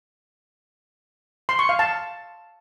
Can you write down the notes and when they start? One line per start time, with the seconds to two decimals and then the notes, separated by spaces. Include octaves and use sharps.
1.49 C6
1.59 C#6
1.69 F5
1.79 A5